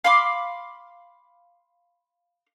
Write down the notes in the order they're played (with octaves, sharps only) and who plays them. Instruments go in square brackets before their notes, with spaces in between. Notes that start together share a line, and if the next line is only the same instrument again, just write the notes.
[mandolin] F5 B5 C6 D6